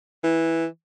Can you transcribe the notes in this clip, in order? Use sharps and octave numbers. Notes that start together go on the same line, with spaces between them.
E3